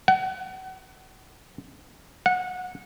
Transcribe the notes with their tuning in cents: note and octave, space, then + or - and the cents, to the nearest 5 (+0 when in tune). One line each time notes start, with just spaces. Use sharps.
F#5 +30
F#5 -20